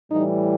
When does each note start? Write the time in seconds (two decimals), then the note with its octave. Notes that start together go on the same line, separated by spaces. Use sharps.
0.11 A2 E3 G3 D#4